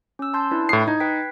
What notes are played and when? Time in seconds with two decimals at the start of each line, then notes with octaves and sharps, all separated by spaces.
0.19 C#4 E6
0.34 A5 C6 G6
0.51 D4 E4 B4
0.69 A2 D#6 C7
0.88 D#4 G#6
1.00 B4 G5 B6